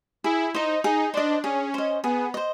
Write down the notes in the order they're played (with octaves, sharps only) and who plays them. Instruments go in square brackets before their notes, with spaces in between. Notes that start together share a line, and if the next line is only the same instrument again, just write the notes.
[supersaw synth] E4 [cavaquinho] G#4
[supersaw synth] D#4 [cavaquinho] C5 D#5
[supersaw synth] D#4 [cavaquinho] G#4
[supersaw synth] D4 [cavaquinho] C5 D#5
[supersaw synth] C#4 [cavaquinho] G#4
[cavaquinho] C5 D#5
[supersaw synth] B3 [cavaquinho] G#4
[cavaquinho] C5 D#5